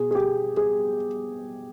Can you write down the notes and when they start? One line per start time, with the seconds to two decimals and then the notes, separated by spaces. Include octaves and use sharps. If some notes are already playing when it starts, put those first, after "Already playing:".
Already playing: B2 G#4
0.11 G#4
0.15 G4
0.57 G#4